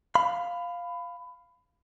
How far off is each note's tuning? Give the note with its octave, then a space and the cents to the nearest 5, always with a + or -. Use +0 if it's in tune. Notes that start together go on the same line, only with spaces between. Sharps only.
F5 +0 B5 +20